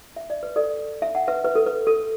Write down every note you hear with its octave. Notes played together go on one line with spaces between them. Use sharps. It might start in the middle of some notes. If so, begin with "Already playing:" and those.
E5
D5
B4
A4 D5
E5
F#5
B4 E5
B4
A4
B4
A4